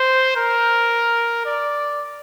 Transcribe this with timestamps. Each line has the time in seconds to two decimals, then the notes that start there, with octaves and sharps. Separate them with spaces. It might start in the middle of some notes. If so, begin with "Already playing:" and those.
Already playing: C5
0.36 A#4
1.46 D5